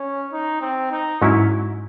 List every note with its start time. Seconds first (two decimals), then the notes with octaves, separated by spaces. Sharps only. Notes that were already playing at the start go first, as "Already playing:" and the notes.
Already playing: C#4
0.32 D#4
0.61 C4
0.91 D#4
1.22 G#2 F#3 C#4 E4